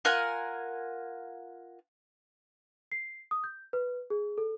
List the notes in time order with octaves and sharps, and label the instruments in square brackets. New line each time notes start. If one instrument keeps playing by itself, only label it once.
[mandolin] F4 A#4 F#5 G#5
[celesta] C7
D#6
G6
B4
G#4
A4